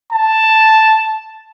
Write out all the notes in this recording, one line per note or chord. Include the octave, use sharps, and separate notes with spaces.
A5